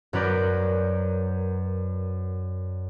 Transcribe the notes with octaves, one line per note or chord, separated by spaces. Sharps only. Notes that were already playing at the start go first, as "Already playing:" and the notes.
F#2 C#4 A#4 B4 D5 G6